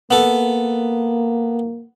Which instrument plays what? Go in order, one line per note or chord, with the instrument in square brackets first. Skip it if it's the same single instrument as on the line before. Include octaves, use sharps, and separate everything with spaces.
[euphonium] A#3 [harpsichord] B3 A4